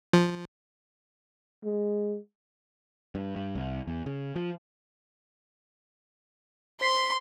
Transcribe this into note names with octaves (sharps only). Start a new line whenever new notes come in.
F3
G#3
G2
G2
C2
E2
C#3
F3
C5 C6 B6 C7